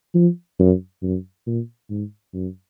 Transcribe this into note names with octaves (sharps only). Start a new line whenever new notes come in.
F3
F#2
F#2
A#2
G#2
F#2